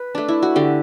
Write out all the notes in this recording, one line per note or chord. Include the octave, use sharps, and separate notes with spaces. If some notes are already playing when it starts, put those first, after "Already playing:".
Already playing: B4
A3 D4
E4
F#4
D3 G4